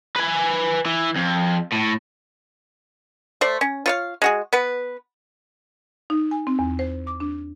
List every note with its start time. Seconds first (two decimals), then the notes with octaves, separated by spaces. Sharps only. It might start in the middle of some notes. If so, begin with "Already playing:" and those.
0.16 B4 G#5
0.86 E3
1.16 F2
1.73 A2
3.41 A3 C5 D5
3.61 C#4
3.86 F4 C#5 F5
4.22 G#3 F#4 G#4
4.53 B3 B4
6.10 D#4
6.31 G#5
6.47 C4
6.59 E2
6.79 C5
7.07 D6
7.20 D4